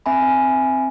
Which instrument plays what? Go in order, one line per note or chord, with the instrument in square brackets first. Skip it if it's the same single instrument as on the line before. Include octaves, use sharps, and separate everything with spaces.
[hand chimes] C4 E5 G#5 B5